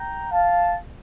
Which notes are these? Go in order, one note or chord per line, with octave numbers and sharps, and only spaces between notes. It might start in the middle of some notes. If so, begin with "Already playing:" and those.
Already playing: G5 A#5
F5 A5